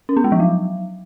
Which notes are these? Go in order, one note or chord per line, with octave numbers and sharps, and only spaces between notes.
C#4
B3
G#3
F3
F#3